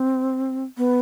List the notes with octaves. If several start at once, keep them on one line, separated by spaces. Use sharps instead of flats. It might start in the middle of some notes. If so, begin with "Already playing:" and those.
Already playing: C4
B3